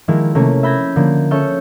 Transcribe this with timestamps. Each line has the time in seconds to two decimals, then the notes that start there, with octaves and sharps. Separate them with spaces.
0.08 D#3 F3 G#3 A#3 E4
0.35 C3 A3 A#3 C#4
0.63 E5 B5 G6 G#6 A#6
0.96 D3 F3 A#3
1.31 C#4 A4 E5 C#6 G6 E7